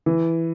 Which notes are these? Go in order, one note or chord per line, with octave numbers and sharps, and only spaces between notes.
E3